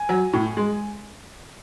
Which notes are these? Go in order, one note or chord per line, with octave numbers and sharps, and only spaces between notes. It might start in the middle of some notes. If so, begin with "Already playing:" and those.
Already playing: G#5
F#3
A2
G#3